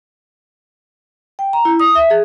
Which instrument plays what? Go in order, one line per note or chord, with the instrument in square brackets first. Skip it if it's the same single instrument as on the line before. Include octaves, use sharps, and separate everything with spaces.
[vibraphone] G5
A#5
E4
D#6
E5
G#4